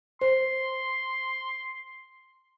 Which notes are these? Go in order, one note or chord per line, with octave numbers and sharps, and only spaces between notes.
C5 C6